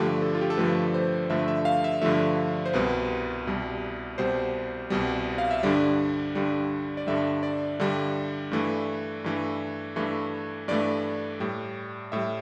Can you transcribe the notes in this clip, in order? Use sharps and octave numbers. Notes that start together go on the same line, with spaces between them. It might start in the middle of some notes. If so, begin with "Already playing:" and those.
Already playing: G2 D3 F3 A3 G4
A4
F4
G4
A4
G2 D3 F3 A3 B4
C5
G2 D3 F3 A3 E5
E5
F5
E5
G2 D3 F3 A3 E5
C5
C2 B2 G3 B4
C2 B2 G3
C2 B2 G3 C5
C2 B2 G3
F5
E5
G2 D3 G3 D5
G2 D3 G3
D5
G2 D3 G3 E5
D5
G2 D3 G3
G2 E3 A3
G2 E3 A3
G2 E3 A3
G2 E3 A3 D5
A2 G3
A2 G3 E5